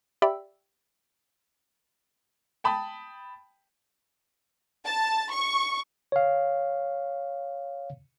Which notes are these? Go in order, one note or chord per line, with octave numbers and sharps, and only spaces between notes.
G4 D5 E5 G5 B5 E6
G5 A5 B5 D#6
A5
C#6
C#5 F5